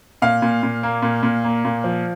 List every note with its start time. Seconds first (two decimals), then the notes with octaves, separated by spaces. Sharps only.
0.22 A#2 F5
0.42 A#2
0.63 A#2
0.83 A#3
1.02 A#2
1.23 A#2
1.44 A#3
1.65 A#2
1.84 F3